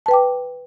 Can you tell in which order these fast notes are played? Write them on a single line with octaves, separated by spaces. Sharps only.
A5 B4 G5 D6